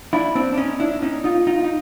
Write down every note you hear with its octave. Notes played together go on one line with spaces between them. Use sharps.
D4 E4
C4 D4
D4
C#4 D#4
D4 E4
C#4 D#4
D#4 F4
D#4 F4
D#4